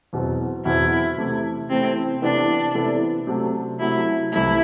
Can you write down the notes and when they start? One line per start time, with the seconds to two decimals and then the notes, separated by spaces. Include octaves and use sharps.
0.13 E2 B2 F#3 C4
0.65 E2 B2 F#3 C4 E4
1.17 C3 E3 A3 E4
1.70 C3 E3 A3 C4 E4
2.22 C3 E3 B3 D4 E4 A4
2.75 C3 E3 B3 E4 A4
3.27 C3 F#3 A3
3.80 C3 F#3 A3 E4
4.32 C2 C3 E3 A3 E4